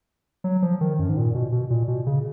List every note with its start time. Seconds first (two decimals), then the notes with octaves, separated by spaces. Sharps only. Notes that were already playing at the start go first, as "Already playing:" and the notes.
0.44 F#3
0.62 F3
0.81 D#3
0.99 F#2
1.09 G#2
1.17 A#2
1.35 B2
1.52 B2
1.70 A#2
1.88 B2
2.07 C#3